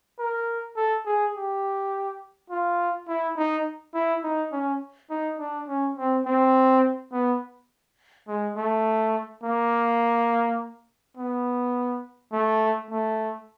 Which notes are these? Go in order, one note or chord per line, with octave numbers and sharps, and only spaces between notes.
A#4
A4
G#4
G4
F4
E4
D#4
E4
D#4
C#4
D#4
D4
C#4
C4
C4
B3
G#3
A3
A#3
B3
A3
A3